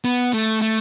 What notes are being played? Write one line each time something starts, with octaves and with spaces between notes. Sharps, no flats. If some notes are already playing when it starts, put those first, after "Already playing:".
B3
A3
A3